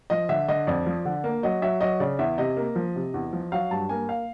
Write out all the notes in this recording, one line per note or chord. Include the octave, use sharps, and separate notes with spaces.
F3 D#5
D3 E5
D3 D#5
F2 D5
F3
D3
A#3
F#3 D#5
F#3 E5
F#3 D#5
C#3 D5
E2 E5
C3 D#5
A#3
F3
C3
E2
F3
F#3 F5
G2 A5
A#3 G#5
F5